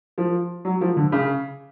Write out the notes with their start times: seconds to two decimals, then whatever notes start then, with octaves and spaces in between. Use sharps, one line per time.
0.18 F3
0.65 F#3
0.81 F3
0.97 D3
1.12 C#3